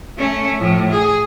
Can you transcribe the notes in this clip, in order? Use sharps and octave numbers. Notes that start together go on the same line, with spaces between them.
A3 C#4
A2 F3
G#4